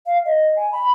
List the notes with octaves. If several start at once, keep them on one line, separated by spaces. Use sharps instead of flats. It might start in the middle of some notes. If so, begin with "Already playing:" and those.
F5
D#5
G#5
B5